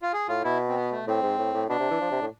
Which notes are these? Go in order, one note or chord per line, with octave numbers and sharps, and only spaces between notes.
F4
G#4
A2 F4
B2 E4
C4
B3
A3
A2 C4
G#2
A2
A2
B2 D4
C3
E3
F3
C3
A2